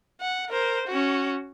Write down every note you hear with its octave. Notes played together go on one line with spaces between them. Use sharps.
F#5
A#4 C5
C#4 F#4